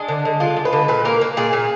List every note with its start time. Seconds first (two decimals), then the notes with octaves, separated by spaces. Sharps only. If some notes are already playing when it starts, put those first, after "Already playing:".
Already playing: G#3 D4
0.08 D3
0.25 D3
0.40 G#3 F4
0.56 G#3
0.65 B4
0.73 D3
0.88 A#2 B4
1.05 A#3 A#4
1.21 A#3
1.37 A#2 G#4
1.53 A#2